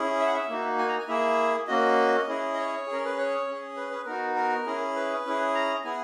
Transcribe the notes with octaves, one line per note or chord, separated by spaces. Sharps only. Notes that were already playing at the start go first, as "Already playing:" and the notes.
Already playing: C#4 E4 G#4
E5
F#5
E5
A#3 D#4 F#4
G#5
A#5
G#5
A#3 E4 G#4 E5
A#3 C#4 F#4 D#5
C#4 E4 G#4
D#5
C#5
G#4
C#4 A#4
B4
C#5
C#4 G#4
B4
B4
B3 D#4 F#4 A#4
A#4
C#4 E4 G#4
B4
C#4 E4 G#4
A#5
B3 E4 G#4 G#5